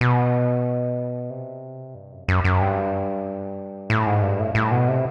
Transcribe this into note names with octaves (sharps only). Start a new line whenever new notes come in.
B2
C3
G2
F#2
F#2
F#2
G2
A2
G#2
G2
A2
A2
B2
C3